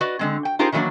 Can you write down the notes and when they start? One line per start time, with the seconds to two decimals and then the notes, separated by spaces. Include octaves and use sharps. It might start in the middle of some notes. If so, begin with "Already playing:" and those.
0.01 F#4 B4 D5 D#5
0.19 D3 G#3 C4
0.45 G5
0.59 D#4 F4 G4 G#4 A#4 C5
0.72 D#3 E3 F#3 G#3 A#3 D4